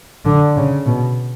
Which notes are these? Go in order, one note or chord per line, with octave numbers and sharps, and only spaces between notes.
D3
C#3
B2